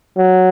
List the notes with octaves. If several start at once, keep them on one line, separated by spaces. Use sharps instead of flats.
F#3